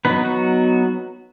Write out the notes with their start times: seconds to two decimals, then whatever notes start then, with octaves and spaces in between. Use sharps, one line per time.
0.05 F#3 B3 D#4 B4
0.25 F#4